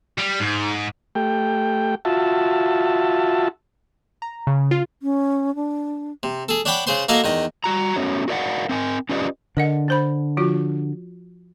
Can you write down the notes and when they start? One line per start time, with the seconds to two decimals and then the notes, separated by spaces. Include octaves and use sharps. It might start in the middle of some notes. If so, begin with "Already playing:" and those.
0.18 G3
0.40 G#2
1.15 A3 G4 G5
2.05 F4 F#4 E5 A5
4.22 A#5
4.47 C#3
4.71 F4
5.03 C#4
5.55 D4
6.23 C3
6.49 G#4 A4
6.65 D4 C#5 F#5 G5 B5 D6
6.87 C#3 G#4 C5 C6
7.09 A#3 F#4 A4 A#4 D#5 F5
7.24 E2 D#3 D#5
7.64 G3 F#4 A#5
7.96 A3 B3 C#4 F#4 C#5
8.28 F#4 A#4 D5 F5 F#5
8.69 C4 A#4 G#5
9.09 C#4 F4 G4 B4 D5 D#5
9.57 D3 A#4 D#5 F#5
9.88 D4 C5 B5
10.37 F3 F4 F#4